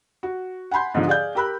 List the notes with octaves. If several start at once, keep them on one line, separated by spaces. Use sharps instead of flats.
F#4
F#5 G#5 B5 C6 G6
G#2 D3 F3
G#4 D5 F5 G6
G4 A#4 B5 E6 F#6